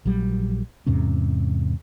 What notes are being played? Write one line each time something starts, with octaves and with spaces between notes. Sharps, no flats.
A#1 F#3 G3
E2 G#2 C3 C#4